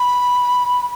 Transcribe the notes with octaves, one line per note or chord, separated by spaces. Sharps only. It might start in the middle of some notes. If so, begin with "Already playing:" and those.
Already playing: B5